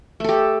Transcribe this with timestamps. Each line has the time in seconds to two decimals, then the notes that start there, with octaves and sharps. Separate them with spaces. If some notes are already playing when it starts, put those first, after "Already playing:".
0.20 A3
0.24 A4
0.29 G4